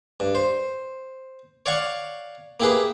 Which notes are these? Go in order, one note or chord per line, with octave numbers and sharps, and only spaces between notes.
G2
C5
C#5 D5 F5 F#5 C#6
A#3 E4 G4 G#4 B4